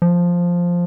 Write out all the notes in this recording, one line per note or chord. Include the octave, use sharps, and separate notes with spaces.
F3